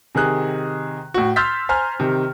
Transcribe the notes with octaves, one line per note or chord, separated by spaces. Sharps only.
C3 D#3 G#4 F#6
A2 F#4
C6 E6 F6 G6 A6 B6
C5 G#5 A#5 C6 F6
C3 D#3